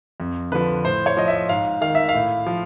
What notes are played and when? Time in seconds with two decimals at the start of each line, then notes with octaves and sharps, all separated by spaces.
0.20 F2
0.52 D3 F3 B4
0.84 A2 C5
1.06 C#5
1.17 F3 D#5
1.28 E5
1.49 G#2 F5
1.81 D#3 F5
1.95 E5
2.09 F5
2.14 A2
2.46 F3